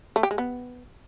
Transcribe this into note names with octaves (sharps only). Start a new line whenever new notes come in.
A3
G4
G#3
B3